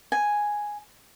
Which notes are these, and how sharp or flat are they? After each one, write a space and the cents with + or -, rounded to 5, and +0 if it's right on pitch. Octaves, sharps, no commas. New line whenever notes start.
G#5 +0